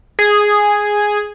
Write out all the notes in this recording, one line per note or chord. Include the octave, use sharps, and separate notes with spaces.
G#4